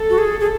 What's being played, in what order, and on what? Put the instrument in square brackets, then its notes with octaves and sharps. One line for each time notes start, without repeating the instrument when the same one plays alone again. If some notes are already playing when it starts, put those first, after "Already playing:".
Already playing: [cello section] A4
[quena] F#4
G#4
G#4